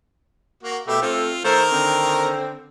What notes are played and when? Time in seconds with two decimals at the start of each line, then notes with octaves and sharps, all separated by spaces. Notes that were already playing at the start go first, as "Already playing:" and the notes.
0.63 A#3 F#4
0.87 B2 A3 G4 E5
1.02 A3 C4 F4
1.45 D#3 A3 A4 A#4 C5 A#5
1.72 D3 C4